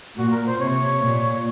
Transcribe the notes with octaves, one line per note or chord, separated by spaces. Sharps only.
A#2 F#4
A#4
C5
C3 C#5
A#2